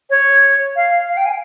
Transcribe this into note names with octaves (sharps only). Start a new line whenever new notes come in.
C#5
F5
F5
G5
G#5